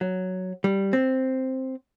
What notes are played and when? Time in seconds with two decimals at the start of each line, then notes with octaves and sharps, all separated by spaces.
0.01 F#3
0.64 G3
0.93 C4